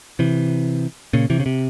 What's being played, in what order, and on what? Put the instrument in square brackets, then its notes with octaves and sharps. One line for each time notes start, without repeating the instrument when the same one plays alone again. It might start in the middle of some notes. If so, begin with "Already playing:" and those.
[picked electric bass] C3 E3
A#2 C#3
C3 E3
C#3
C3